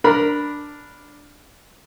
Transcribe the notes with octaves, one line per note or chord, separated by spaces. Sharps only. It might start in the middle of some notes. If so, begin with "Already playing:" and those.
D4 A#4 B5